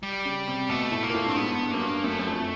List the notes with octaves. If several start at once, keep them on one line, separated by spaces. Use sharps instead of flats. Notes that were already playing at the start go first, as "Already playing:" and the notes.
G3
C#3
C3
B2 A3
A2
A#3
A#2
A2
G2 C4
G#2 B3
G2
F#2 A#3
G2
F#2 A3
F#2
F2